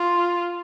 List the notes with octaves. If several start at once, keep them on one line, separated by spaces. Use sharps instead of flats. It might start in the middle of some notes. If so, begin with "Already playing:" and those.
Already playing: F4